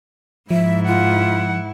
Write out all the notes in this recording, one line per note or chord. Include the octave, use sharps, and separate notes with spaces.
G#2 F3 E4 E5
F4 F#5